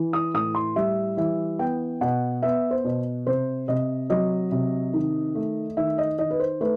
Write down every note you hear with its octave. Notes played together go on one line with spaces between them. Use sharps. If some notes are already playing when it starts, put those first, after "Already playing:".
Already playing: E3
D#6
A2 D#6
C6
G3 E5
E3 E5
B3 G5
B2 F#5
B3 E5
C5
B2
C3 C5
C3 D#5
F#3 D#5
C3
D#3
A3
D#3 E5
D#5
D#3 D#5
B4
C5
A3 B4